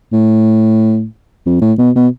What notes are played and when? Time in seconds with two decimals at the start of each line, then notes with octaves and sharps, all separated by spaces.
0.13 A2
1.46 F2
1.61 A2
1.78 B2
1.96 B2